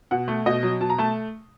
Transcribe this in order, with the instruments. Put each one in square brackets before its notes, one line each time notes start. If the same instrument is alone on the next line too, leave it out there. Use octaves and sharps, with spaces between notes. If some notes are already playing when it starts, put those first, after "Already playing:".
[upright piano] B2 F#5
A3
B2 D#5
F#3
B2 A5
A#5
A3 A5